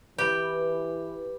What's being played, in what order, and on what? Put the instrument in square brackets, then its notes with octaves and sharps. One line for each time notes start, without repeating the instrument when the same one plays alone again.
[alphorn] E3 [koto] G4 [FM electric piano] B4